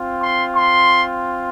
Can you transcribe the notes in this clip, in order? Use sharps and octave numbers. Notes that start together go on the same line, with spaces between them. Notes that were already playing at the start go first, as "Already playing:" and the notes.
Already playing: C4 F4
C6
C6